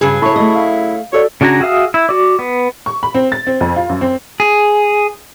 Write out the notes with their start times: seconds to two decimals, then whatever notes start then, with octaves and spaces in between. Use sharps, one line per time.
0.01 G2 C#3 F#3 G#4 B4
0.22 E4 A4 C#5 A5 B5 C#6
0.36 A3 D#5
0.55 F5
1.13 F#4 A4 C#5 D5
1.41 C#3 D4 F#4 G#5 A#5
1.60 F#4 G#4 E5 F5 D#6
1.94 E4
2.09 F#4 D5
2.39 B3
2.86 C#6
3.03 B5
3.15 C4
3.32 A6
3.47 C4
3.61 F2
3.76 F4
3.89 F#2
4.01 C4
4.40 G#4